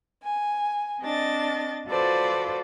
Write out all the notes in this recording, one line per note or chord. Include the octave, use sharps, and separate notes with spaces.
G#5
C4 D4 D#5 A6
F4 F#4 A4 B4 C5 D5